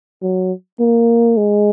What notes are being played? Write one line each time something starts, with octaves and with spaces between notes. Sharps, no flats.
F#3
A#3
G#3